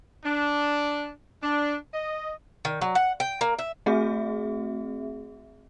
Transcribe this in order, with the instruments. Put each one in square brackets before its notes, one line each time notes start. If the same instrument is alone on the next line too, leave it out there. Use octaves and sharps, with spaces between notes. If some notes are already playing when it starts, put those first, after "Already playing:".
[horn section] D4
D4
D#5
[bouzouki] D#3
F#3
F#5
G5
A#3
E5
[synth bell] A3 C4 F#4 G#4 E5